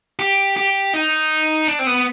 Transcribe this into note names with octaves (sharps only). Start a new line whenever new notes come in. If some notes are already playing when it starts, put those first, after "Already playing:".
G4
G4
D#4
D4
C4
B3